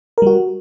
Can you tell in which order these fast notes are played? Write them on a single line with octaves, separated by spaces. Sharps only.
A#4 G3 F#4